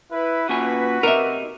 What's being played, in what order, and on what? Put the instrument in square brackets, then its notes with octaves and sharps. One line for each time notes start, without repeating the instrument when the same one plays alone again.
[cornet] E4 [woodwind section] B4
[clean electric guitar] A#2 C#4 G#5 [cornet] F#4
[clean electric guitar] C3 D#4 [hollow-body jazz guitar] A#4 E5